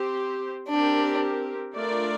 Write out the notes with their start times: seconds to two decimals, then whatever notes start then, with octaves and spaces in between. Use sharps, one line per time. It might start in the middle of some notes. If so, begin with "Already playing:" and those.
Already playing: C4 G4 C5
0.69 C4 D4 G4 A#4
1.74 A3 D4 F4 A#4 D5